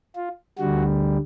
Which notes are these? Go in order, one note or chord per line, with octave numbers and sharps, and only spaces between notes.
F4
D2 D3 G3 F#4